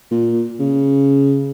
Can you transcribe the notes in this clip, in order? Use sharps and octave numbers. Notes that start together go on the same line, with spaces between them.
A#2
C#3